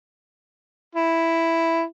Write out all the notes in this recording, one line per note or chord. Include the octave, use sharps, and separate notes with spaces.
E4